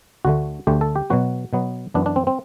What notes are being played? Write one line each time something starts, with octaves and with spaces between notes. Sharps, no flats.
D2 D3 A3 F#4
D2 D3 A3 G4
A4
G4
B2 F#3 B3 F#4
B2 F#3 B3
F#2 E3 B3 D4
D4
C4
C4